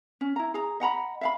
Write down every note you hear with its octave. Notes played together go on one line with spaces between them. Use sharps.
C#4
E4 A#5
G#4 A#5
D#5 F#5 A#5 B5
E5 F5 B5